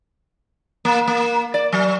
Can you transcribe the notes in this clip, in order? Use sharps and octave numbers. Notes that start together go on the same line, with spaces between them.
A#3
A#3
D5
F#3